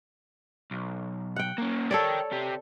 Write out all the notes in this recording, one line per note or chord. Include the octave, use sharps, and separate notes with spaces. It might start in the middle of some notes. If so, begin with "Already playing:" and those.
B1
F#5 G5
A#3 C#4
A4 A#4 C#5 D5 G5
C3 G4